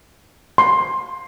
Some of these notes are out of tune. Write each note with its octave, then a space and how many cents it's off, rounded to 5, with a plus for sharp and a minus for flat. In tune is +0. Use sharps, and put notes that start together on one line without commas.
C6 +15